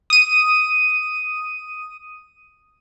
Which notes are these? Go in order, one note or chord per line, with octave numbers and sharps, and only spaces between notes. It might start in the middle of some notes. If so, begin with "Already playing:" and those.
D#6 D#7